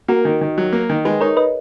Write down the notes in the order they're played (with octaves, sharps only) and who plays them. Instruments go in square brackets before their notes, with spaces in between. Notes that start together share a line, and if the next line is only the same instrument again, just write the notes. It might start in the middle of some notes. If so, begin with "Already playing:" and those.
[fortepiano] A#3 [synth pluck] F#4 A#4
[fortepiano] D#3
D#3
F#3
A#3
D#3
[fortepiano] G#3 [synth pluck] G#4 B4
[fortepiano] D#4 [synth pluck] A#4 C#5
[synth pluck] B4 D#5